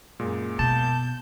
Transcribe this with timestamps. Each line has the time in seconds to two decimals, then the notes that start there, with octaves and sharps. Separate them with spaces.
0.19 F#2 A#2 G#3
0.59 B2 A5 G6